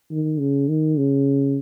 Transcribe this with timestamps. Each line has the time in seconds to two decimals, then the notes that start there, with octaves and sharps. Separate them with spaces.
0.11 D#3
0.40 C#3
0.69 D#3
0.98 C#3